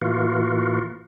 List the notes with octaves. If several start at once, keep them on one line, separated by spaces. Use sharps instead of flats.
A2 E3 A#3 F4 F#4